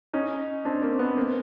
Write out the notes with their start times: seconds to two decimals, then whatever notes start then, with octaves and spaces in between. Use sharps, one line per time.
0.13 C#4 D#4
0.65 C4 D4
0.82 A#3 C4
0.99 B3
1.17 A#3 C4